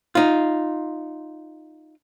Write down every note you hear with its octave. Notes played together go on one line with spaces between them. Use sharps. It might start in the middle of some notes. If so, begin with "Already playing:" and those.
D#4 F4